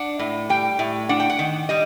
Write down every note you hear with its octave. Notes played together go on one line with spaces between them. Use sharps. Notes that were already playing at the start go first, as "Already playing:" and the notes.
Already playing: D4 F#5
A2
G3 G5
A2
D4 F#5
G5
F#5
D#3
G3 D#5